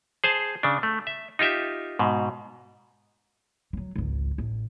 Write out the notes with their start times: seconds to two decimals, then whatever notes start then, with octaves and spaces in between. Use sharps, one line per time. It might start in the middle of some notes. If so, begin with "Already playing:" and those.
0.24 G#4 C5 A5
0.63 C#3 D4
0.83 A3
1.07 E5
1.39 D#4 F4 G4 E5
1.99 G#2 B2
3.73 F#3 G3
3.96 G#1 C#2
4.38 A1